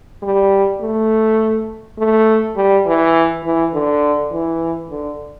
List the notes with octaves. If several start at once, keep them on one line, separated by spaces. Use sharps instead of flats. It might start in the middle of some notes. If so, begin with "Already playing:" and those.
G3
A3
A3
G3
E3
E3
D3
E3
D3